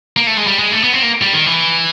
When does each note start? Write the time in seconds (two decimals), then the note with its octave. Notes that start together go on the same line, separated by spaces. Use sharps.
0.17 A#3
0.27 A3
0.37 G#3
0.47 G3
0.59 G#3
0.72 A3
0.84 B3
0.93 C4
1.02 A#3
1.22 G3
1.33 D#3
1.46 E3